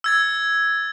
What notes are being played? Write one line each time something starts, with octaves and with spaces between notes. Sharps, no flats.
E6 G#6 A6